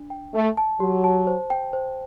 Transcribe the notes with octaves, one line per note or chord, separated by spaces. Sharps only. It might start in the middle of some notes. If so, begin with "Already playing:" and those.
Already playing: D4
G5
A3 A5
A5
F#3 G4
A5
C5
G5
C5